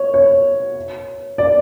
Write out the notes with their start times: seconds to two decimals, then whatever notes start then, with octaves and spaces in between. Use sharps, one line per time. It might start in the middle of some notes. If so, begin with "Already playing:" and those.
Already playing: C#5
0.14 C#5
1.38 D5